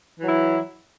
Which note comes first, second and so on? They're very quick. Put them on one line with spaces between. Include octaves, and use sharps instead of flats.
E3 F#3 E4